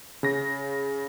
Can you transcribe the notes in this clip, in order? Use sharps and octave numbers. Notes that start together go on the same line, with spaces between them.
C#3 A#6